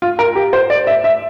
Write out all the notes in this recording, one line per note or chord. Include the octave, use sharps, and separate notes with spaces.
F4
A#4
G4
C5
D5
E5
E5